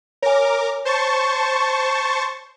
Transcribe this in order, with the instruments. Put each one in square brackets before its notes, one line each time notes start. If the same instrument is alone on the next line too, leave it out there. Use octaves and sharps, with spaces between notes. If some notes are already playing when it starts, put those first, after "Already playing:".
[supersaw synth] A#4 D6 [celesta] C#5 G#5
[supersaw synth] C5 A5 C#6